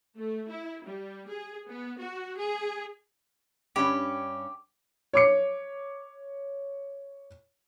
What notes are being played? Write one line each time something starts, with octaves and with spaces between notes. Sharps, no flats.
A3
E4
G3
G#4
B3
F#4
G#4
G2 C#4 G4
C#5 D6 C#7